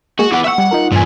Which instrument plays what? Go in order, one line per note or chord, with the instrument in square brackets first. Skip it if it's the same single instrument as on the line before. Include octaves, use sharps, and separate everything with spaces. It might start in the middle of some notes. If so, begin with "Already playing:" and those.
[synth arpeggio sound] G#3 A#3 G#4 [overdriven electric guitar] F#4
[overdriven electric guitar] E3 B3 [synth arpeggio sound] F#5 D6
[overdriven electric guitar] E5 F#5 [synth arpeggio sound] C#6 E6
[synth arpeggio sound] G3
D#4 F4 A#4
[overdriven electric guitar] E2 A#2 [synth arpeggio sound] G2 G#5